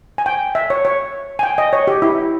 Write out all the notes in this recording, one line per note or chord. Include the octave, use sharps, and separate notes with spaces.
G#5
G5
E5
C#5
C#5
G#5
G5
D#5
C#5
G4
E4